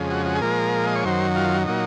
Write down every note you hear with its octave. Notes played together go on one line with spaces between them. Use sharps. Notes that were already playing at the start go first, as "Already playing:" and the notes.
Already playing: F2 C#3 G#3
F#4
F#4
G#4
A#2 F3 G#3 A#4
D#5
C#5
F#2 D#3 F#3 C5
F4
A#2 F#3 D#4